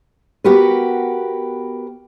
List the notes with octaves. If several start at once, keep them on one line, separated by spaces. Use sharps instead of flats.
B3 F#4 G4 A#4 B4